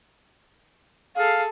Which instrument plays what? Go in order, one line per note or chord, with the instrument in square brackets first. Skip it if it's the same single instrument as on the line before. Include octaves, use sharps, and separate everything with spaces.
[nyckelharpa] G#4 A4 [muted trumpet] F5